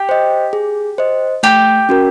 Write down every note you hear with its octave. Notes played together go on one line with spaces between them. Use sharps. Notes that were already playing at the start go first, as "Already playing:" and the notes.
Already playing: G4
C5 D#5
G#4
C5 D#5
A3 G4
C#4 F#4 A#4